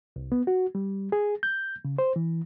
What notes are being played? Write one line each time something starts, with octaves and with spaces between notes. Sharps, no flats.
C2
B3
F#4
G3
G#4
G6
C#3
C5
E3